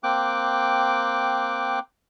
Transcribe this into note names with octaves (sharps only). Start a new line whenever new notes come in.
A#3 C4 G5 D6 F#6